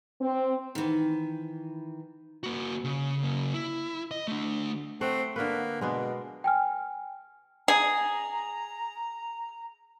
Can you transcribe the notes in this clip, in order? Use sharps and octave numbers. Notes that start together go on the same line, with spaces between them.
C4
D#3 E3
A#3 F#4
C#3
C#3 A#3
E4
D#5
A3 D4
A3 C4 F#5
D3 A#3 B3 B4
B2 G#3 B3 D4
G5 G#5 F6
G#4 A#5